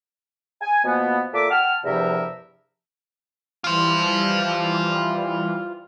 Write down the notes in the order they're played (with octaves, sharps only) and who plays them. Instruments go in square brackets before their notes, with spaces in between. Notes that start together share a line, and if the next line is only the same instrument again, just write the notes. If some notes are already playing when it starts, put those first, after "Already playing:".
[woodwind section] G#5
B2 F3 A#3 B3
A#2 A4 E5 D6
F#5 G5 A5 F6
E2 G2 C3 F3 A#4 E5
[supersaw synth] E3 G3 [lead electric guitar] F4 C5